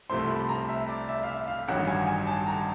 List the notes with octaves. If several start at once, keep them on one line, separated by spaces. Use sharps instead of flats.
C2 C3 F3 A3 C4 C6
B5
A#5
E5
D5
E5
F5
E5
F5
A1 G2 D#3 F#3 F#5
G#5
G#5
A5
A#5